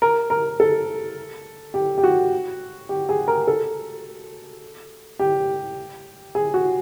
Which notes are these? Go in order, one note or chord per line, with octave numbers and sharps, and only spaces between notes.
A#4
A#4
A4
G4
G4
F#4
G4
G#4
A#4
A4
G4
G#4
F#4